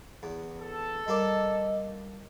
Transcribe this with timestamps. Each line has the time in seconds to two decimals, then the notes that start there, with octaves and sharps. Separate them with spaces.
0.23 E2
0.59 A4
1.08 G3 A#3 D5 D#5